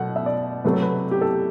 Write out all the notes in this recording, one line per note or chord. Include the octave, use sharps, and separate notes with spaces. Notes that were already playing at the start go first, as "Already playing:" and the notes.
Already playing: B2 F#3 A3 F#5
E5
D5
C3 F#3 A3 B4
A4
B4
G4
A4